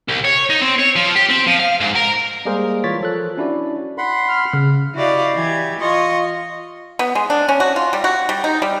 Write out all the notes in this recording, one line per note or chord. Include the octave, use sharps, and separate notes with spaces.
C2
C#5
D#4
C4
C#5
F3
G4
C4
F3
F5
G#2
A#4
G3 G#3 A#3 G#4 A#4 C5
E3 F4 C#5 A6 B6
F3 A4 F#6
C#4 D4 E4 F#4 D5
F#5 B5 C6
F6
C#3
E4 F#4 G4 D5 D#5 F5
E3 G4 G#6
F4 D#5 C6 C#6
B3
G#3
D4
C#4
F#4
F4
G3
F#4
G3
D#4
G3